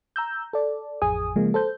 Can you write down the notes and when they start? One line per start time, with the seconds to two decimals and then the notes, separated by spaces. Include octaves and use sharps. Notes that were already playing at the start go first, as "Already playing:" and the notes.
0.16 A#5 E6 G6
0.53 A4 D5
1.02 A1 F2 G#4 G#5 D#6
1.36 C#3 F3 G#3 A#3
1.54 A4 C5 G6